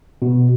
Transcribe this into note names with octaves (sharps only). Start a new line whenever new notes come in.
B2